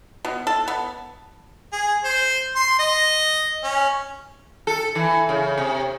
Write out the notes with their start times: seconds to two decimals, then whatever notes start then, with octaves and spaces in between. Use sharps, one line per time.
0.25 B2
0.47 A4
0.68 B3
1.73 G#4
2.05 C5
2.56 C6
2.79 D#5
3.64 C#4
4.67 A4
4.95 E3
5.29 C#3
5.58 C3